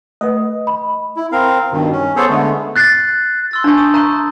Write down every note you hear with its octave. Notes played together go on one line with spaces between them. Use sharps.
A3 B4 D#5
B5
E4
C4 A#4 F5
G2 B2 D#3
C#4
B3 G#4 A4 C5 C#5
D3 G#3 A3 B3
F#6 A6 C7
C6 E6 A6
D4 A5 C#6 G6
D#6
A#5 B5 C#6 F#6 D#7